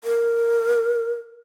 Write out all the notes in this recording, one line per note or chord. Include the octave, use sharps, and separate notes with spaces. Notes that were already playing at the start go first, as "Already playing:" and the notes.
A#4